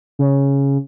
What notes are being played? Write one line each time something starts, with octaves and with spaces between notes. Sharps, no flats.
C#3